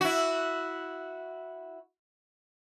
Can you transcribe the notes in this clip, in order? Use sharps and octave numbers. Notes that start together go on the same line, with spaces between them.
E4 F#4